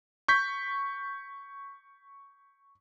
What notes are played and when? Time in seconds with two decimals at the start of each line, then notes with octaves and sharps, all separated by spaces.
0.28 C#6 G6 B6